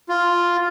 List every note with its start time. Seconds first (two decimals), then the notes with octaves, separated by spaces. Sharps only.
0.09 F4